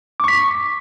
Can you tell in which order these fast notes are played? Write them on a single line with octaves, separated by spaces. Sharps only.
D6 C#6 B6